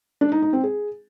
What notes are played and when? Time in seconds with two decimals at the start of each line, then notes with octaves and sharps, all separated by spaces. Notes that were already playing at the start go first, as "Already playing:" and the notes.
0.21 D4
0.32 D#4
0.42 D#4
0.53 C4
0.63 G#4